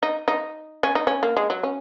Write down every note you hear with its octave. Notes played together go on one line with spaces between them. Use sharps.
D#4
D#4
C#4
D#4
C#4
A#3
G#3
F#3
C#4